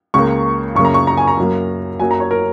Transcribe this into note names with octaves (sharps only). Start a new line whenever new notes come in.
C#2 C#3 A#3 C#6
F#2 C#3 A#3 C#6
A#5
C#6
A#5
G#5
A#5
F#2 F#3 A#3
F#2 F#3 A#3 G#5
A#5
C#5
A#4